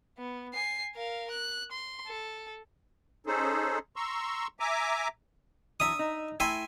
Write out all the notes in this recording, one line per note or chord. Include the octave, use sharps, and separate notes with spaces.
B3
G#5 C7
A#4 F5
F#6
C6
A4
C#4 D#4 G#4 A4 C5
A#5 C6 C#6 E6
E5 G#5 A#5 D6
E3 F#3 D4 E5 D#6
D#4
A3 E4 E5 G5 G#5 C6